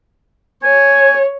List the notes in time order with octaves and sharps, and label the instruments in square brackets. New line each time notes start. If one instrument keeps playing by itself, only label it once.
[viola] C#5 [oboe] G#5